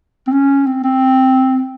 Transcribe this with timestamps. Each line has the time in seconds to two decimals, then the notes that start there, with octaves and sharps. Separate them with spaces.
0.27 C4
0.32 C#4
0.66 C4
0.84 C4